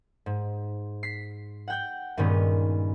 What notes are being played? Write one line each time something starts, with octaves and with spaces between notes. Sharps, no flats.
G#2
B6 C7
F#5 G5 G6
G2 A#2 D#3 G#3 B3 C#4